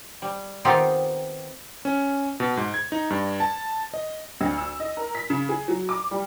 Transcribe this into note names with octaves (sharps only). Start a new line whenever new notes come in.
G3
D#3 B3 C4 D#4 F4 G4
C#4
B2
G#2
G#6
D#4
G2
A5
D#5
D2
E6
D#5
A#4
B6
C#3
G#4
F#3
D6
G3